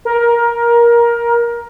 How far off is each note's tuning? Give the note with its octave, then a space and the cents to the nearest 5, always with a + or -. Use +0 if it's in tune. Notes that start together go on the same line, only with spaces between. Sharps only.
A#4 +15